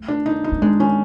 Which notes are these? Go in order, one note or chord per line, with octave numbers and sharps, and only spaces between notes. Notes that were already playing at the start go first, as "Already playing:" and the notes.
Already playing: A3
D4
D#4
D#4
A3
G#3 D4
C#4